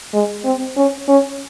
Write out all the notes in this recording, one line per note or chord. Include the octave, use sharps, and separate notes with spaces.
G#3
C4
C#4
C#4